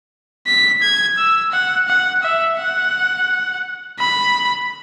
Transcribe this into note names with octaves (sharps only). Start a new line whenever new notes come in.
B6
G#6
E6
F#5
F#5
E5
F#5
B5